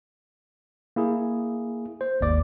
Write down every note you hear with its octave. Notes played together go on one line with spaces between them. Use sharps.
A#3 E4 G#4
C5
G#1 D#2 D5 D6